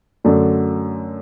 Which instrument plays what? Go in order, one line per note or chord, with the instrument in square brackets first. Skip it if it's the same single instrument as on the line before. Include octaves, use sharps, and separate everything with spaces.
[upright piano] F#2 D3 A3 D4